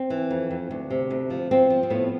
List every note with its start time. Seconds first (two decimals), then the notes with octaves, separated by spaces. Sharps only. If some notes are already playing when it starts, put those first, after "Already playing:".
Already playing: C4
0.10 E3
0.31 F2
0.51 F2
0.71 D2
0.91 C3
1.10 D2
1.30 F3
1.51 F3 C4
1.70 F3
1.83 C4
1.90 A2 B3